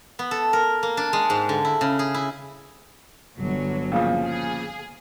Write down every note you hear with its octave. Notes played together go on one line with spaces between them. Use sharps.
B3
A4
A#4
A#3
D4
G#3
G#2
D3
E4
C#3
G#4
E4
G1 F#3
A#2 C#3 F3
G#4